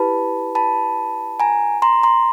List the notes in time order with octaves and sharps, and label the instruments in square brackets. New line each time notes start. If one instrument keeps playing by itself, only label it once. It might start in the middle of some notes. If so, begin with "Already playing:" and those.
Already playing: [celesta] E4 G4 B4 [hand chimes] A5 B5
[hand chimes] A5 B5
G#5 A#5
A#5 C6
A#5 C6